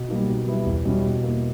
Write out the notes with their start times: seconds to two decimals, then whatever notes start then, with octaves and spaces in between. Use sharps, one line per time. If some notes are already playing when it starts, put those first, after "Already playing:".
Already playing: B2
0.08 G3 A#3 D#4
0.27 B2
0.46 G3 B3 E4
0.66 E2
0.85 B2 G3 C#4 E4
1.05 B2
1.23 A#3 E4